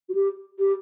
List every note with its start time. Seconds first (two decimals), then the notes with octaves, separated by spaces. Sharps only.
0.09 F#4
0.14 G4
0.59 G4